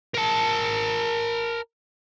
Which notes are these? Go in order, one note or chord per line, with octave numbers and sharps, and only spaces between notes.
A#4 A5